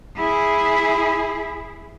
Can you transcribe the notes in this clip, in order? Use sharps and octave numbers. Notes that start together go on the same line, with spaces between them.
E4 G#4